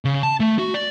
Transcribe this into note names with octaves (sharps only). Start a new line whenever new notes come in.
C#3
A5
A3
F#4
D5